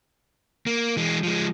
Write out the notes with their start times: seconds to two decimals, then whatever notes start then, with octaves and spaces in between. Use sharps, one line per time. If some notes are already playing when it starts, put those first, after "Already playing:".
0.66 A#3
0.97 E3 G#3
1.23 F3 G#3